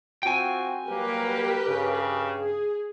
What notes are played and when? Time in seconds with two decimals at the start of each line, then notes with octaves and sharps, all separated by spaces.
0.23 C4 F4 F#4 G5 G#5
0.87 F#3 G3 A#3 G4 A#4 B4
1.66 G2 C#3
2.37 G#4